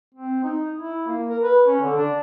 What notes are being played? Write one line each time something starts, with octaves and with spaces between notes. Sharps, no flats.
C4
D#4
E4
A#3
A#4
B4
C#4
D3
D4